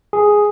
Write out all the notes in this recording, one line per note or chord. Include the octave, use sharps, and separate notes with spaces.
G#4